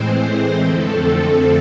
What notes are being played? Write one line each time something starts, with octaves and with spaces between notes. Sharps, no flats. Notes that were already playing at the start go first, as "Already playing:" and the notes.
Already playing: A2 E3 G#3 C4 C5
F2 D3 F3 A3 C4 A4